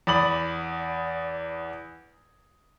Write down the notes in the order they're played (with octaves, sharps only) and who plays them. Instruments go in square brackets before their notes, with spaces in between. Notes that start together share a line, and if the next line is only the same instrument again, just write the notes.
[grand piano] E2 D5 B5 D#6 F#7